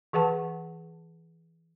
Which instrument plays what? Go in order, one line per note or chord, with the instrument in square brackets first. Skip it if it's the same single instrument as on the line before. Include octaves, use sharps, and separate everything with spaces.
[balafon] E3 G#4 B4 F#5 A5